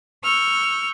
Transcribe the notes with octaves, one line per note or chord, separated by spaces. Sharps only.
C#6 E6 F6 G6